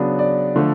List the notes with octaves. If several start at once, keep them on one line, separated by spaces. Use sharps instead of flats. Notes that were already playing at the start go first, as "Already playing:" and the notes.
Already playing: C#3 F#3 B3 D4
D5
D3 F3 A3